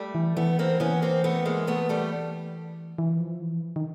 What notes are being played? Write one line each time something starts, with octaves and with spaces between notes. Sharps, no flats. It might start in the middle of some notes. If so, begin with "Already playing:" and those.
Already playing: G3 A3
E3
E3 A3 B3
A#3 C4
E3 B3 C#4
A#3 C4
A3 B3
G#3 A#3
A3 B3
G3 A3
E3
F3
E3
D#3